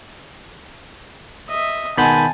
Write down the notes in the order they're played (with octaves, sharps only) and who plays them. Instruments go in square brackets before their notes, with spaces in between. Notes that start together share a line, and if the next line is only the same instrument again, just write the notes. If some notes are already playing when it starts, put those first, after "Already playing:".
[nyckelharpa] D#5 E5
[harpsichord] B2 G#3 [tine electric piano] D#3 B5 G6 [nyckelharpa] G#5 A5